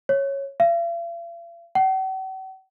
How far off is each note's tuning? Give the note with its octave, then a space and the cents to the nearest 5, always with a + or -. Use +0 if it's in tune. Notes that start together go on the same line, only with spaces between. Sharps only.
C#5 -10
F5 -45
F#5 +45